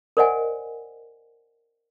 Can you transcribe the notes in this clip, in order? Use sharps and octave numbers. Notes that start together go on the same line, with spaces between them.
A#4 C5 D5 D#5 F#5 G#5